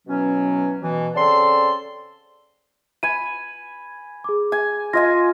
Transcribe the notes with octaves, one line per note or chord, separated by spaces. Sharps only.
B2 E3 F#3 C#4
B2 E3
C#3 C4 A4 D5 A5 C6
G#5 B5 D#7
G#4 D6
G#5
F4 D#5 G#5 A#6